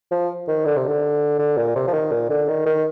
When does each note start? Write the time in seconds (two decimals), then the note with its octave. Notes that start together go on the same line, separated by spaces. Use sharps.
0.11 F3
0.48 D#3
0.65 D3
0.76 C3
0.87 D3
1.39 D3
1.57 A#2
1.76 C3
1.88 F3
1.94 D#3
2.12 A#2
2.30 D3
2.49 D#3
2.66 D#3